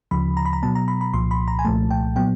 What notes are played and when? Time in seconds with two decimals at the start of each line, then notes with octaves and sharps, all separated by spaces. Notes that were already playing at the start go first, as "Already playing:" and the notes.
0.11 D2 C#3 F3 B5
0.37 A#5
0.45 B5
0.53 A#5
0.63 B2 F#3 B3 A5
0.75 A#5
0.88 B5
1.01 B5
1.14 C2 A#2 F3 C6
1.31 B5
1.48 A#5
1.59 G#5
1.65 C2 A#2 F3 A3 A5
1.91 G5
2.16 A#2 F#3 B3 G5